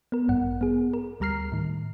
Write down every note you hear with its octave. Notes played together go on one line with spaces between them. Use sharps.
B3 A#4
A1 G2 F#5
B3 G#4
A#4
D2 G3 A#5 F6 C7
A2 D#3